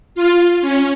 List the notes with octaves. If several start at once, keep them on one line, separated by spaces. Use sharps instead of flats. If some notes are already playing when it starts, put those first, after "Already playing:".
F4
C#4